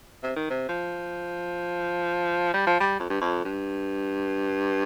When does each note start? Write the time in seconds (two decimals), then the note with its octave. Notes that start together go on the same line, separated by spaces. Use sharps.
0.23 C3
0.36 D#3
0.50 C3
0.69 F3
2.54 G3
2.67 F3
2.81 G3
3.00 F2
3.10 G2
3.21 F2
3.45 G2